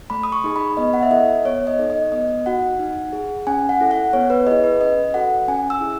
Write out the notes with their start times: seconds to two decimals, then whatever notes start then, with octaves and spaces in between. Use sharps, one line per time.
0.10 A3 B5
0.23 D#6
0.32 C#6
0.44 D#4 G#4
0.56 B5
0.77 B3 D#5
0.93 F#5
1.03 E5
1.11 E4 A4 D#5
1.45 B3 C#5
1.67 D#5
1.79 D#4 A4
1.90 D#5
2.12 B3 D#5
2.46 D#4 F#4 F#5
2.79 D#4
3.13 G#4
3.47 C#4 G#5
3.69 F#5
3.80 E4 A4
3.91 F#5
4.13 B3 C#5
4.30 B4
4.47 E4 G#4 D#5
4.64 B4
4.81 C#4 D#5
5.14 F#4 A4 F#5
5.48 C#4 G#5
5.70 E6
5.81 E4 G#4